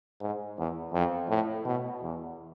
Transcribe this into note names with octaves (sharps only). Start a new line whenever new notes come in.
G#2
E2
F2
A2
B2
E2